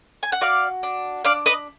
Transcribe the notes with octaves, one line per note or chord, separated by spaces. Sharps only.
G#5
F#5
F#4 D5 F5
D4
D4 D5 F5
B4 D#5